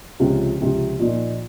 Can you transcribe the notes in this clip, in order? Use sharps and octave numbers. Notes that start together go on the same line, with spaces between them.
C#2 C3 F3 C4 F4
C#2 C3 F3 C4
A#2 F3 A#3 D#4